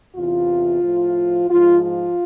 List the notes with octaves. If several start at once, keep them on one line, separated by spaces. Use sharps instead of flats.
E2 C3 E3 F4
A2 F3
G#2 F3 F4
F4